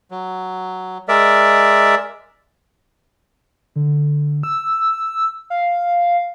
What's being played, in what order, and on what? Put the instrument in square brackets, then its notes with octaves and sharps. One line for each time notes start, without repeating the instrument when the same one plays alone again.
[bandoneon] F#3
G#3 A#4 D5 E5
[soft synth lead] D3
E6
F5